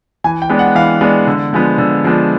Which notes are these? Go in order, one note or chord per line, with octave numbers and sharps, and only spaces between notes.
E3 G#5
G5
G#3 B3 D4
F#5
E3 F5
G#3 B3 D4
D3
F3 G#3 B3 D4
D3
F3 G#3 B3 D4